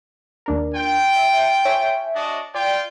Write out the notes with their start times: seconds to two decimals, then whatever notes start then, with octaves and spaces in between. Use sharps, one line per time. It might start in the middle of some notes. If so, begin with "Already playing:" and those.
0.46 D#2 D4 A#4
0.75 F4 G5
1.16 E5
1.65 C#5 E5 G#5
2.14 D4 F#4 D#5
2.55 F4 D5 G5